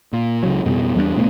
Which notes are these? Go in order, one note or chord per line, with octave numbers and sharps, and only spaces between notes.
A#2
C#2 C#3 F#3
F2 B2 G3
E2 G3 A#3 D4
D1 B2 A3 B3